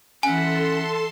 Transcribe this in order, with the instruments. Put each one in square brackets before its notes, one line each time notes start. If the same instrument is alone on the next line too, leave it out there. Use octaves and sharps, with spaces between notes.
[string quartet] E3 E5 F#5 [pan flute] C#4 [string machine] A4 A5 C6 [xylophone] G#5